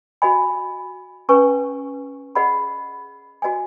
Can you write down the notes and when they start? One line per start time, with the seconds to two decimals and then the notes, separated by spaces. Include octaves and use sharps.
0.22 F#4 D#5 G#5 B5
1.29 C#4 B4 G#5 C#6
2.35 G#4 D#5 F#5 B5
3.42 F#4 D#5 G#5